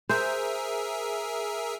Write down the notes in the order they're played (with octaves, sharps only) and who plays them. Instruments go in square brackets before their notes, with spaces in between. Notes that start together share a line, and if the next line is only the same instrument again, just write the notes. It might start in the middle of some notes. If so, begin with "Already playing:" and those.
[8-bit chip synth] G#4 A#4 E5 [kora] C5